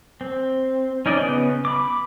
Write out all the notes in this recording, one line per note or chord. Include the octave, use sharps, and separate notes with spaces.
C4
C#4 D#4 D5 D#5
C#3 B3
B5 D6